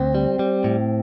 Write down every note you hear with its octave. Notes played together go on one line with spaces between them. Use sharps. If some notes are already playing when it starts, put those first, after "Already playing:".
Already playing: D2 C4
G3
G3
A2